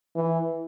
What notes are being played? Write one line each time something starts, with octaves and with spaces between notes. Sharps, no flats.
E3